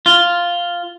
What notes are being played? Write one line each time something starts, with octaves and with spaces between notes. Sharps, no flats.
F4